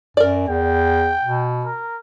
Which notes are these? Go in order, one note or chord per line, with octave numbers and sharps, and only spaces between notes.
F#2 A#4 D5
E2 G5
B2
A#4